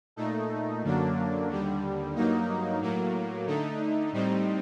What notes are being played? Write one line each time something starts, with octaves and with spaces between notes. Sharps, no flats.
A#2 A3 D#4
F#2 D3 F#3 A#3 D4
D#2 D3 G3
G2 F#3 A#3 D#4
A2 F#3 A#3
D3 A3 D#4
A2 G3 C4 D#4